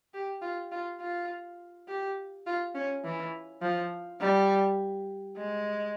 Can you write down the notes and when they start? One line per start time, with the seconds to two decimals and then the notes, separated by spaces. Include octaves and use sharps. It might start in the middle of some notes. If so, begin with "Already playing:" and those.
0.14 G4
0.42 F4
0.72 F4
1.01 F4
1.88 G4
2.47 F4
2.75 C#4
3.05 E3
3.62 F3
4.20 G3
5.37 G#3